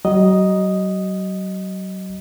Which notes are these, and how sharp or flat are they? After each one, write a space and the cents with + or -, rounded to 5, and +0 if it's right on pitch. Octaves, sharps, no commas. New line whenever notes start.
F#3 +35 D#5 +0